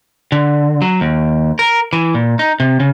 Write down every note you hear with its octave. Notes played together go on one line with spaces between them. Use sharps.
D3
F#3
D#2
A#4
E3
A#2
D#4
C3
C#3